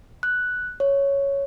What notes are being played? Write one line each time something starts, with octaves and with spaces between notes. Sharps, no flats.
F#6
C#5